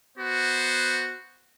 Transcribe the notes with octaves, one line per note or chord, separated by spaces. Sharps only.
B3 F#4 C5